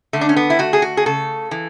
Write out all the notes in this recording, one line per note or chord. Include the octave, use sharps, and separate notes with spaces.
D3 A3
D4
C#4
B3
E4
A3 F#4
G#4
F#4
G#4
C#3 A4
E3